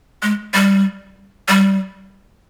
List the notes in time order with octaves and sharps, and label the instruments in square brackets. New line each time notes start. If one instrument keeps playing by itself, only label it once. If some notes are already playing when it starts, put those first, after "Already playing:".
[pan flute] G#3
G3
G3